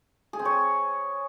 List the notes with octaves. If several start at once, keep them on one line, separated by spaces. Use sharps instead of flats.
G#4
C4
C#5